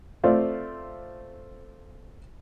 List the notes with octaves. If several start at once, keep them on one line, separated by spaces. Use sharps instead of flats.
A3 C4 F4 D5 F5